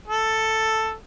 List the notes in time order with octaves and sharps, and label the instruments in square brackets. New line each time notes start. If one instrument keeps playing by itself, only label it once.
[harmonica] A4